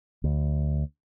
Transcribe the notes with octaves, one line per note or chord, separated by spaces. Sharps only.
D2